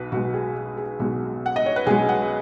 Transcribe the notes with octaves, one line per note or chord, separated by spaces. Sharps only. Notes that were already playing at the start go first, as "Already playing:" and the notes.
Already playing: B1 B2 B4
B1 B2 G#3 F#4
G#4
F#4
G#4
B1 B2 G#3 F#4
F#5
D#5
C#5
B4
B1 B2 G#3 G#4
F#5